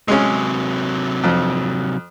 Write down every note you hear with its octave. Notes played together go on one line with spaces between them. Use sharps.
C3 F#3 G#3 C#4
F2